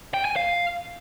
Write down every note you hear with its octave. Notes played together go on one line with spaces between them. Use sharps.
G5
G#5
F5